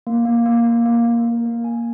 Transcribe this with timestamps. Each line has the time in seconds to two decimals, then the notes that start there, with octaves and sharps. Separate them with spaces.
0.07 A#3
0.26 A#3
0.46 A#3
0.66 A#3
0.86 A#3
1.05 A#3
1.25 A#4
1.46 A#3
1.64 G#5